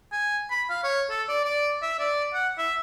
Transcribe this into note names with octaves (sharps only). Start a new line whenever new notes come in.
G#5
B5
F5
C#5
A4
D5
D5
E5
D5
F#5
E5